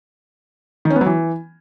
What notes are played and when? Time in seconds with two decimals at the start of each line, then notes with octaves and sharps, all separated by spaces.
0.85 D#3
0.90 C#4
0.96 B3
1.01 F#3
1.06 E3